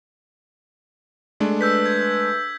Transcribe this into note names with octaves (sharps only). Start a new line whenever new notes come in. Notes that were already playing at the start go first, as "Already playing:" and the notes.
G#3 A3 D4
B4 E6 G6 B6
G#6